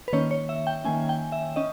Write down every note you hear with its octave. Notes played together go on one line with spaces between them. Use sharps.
B4
D#3 A#3 C#4 C#5
C#5
E5
G5
D#3 A#3 C#4 G#5
G5
E5
C#4 D#5